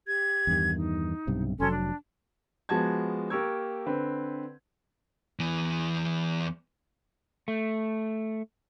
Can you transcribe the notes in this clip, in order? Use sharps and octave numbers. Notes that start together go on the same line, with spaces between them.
G4 G#6
E2 G2 D#3
D#4
B1 G2 C3
F1 F#3 C#4 A4 C6
D4
F3 G#3 B3 F#4 A5 G#6
A#3 G4 A#4 C#6 E6 G#6
D3 C4 B4
E2 E3
A3